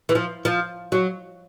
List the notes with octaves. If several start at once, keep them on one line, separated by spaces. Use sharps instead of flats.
E3
F3
F3
F#3